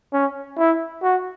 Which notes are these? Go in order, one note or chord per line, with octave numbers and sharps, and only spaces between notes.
C#4
E4
F#4